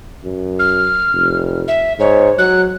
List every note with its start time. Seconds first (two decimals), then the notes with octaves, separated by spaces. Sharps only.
0.24 F#2
0.59 F6
1.13 F1
1.68 E5
1.99 G#2 C#5
2.39 F#3 F#6